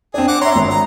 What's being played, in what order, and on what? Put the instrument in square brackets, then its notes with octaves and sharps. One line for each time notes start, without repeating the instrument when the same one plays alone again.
[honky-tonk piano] C4 D4 [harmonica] G#4
[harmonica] F#5 D6
[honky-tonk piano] C#5 E5 [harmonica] A#5 C6
[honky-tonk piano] G#1
[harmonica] A#5